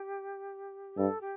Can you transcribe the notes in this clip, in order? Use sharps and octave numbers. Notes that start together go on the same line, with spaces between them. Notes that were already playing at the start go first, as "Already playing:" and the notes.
Already playing: G4
G2 A4
G4